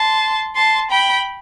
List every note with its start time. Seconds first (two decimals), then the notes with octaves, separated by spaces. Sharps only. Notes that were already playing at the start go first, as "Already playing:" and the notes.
Already playing: A5 C6
0.55 A5 C6
0.90 G5 B5